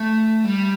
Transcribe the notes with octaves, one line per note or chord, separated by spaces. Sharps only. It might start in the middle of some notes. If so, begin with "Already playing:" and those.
Already playing: A3
G3